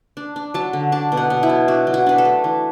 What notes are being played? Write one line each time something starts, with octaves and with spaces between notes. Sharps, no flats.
D4
D4
F#3 A5
D3
D4 A5
B2
F#5
B2
E4
F#3
D4 F#4
F#3
F#4
D4 B4
A4
A3
E3